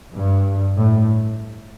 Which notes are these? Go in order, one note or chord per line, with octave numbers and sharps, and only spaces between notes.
G2
A2